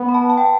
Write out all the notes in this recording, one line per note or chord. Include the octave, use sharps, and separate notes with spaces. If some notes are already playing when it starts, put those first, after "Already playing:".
Already playing: B3
B5
A5
A5
G5